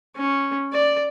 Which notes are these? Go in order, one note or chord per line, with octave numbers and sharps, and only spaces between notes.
C#4
D5